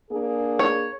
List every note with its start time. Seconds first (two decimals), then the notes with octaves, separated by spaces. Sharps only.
0.11 A#3 D4 G#4
0.59 C#5